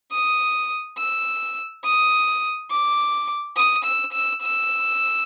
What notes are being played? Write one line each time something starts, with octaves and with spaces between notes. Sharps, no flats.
D#6
E6
D#6
D6
D#6
E6
E6
E6